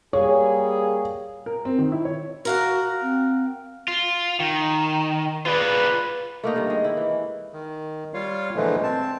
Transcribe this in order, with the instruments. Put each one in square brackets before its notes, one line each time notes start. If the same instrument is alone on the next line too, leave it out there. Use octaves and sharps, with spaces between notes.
[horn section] G3 A#3 G#4 [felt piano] C#5
[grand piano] A#4
C4
D#3
E4
C#5
[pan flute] F#4 [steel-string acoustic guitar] A#4 F5 F#5
[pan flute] C4
[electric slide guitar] F4
D#3
[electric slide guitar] F4 G#4 D5 [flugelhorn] B4
[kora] A3 A#3 D#4
G2 D#3
G#3
E4
E3
[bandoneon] D#3
G3 F4 C#5 F5
A#2 D3 E3 F3 G#3 A3
C4 A5